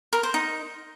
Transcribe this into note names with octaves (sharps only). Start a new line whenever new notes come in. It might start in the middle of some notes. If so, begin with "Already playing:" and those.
A#4
C5
D#4